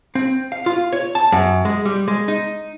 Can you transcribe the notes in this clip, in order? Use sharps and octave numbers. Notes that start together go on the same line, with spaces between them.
C4
F5
F4
C#5
A5
F#2
G#3
G3
G#3
D#4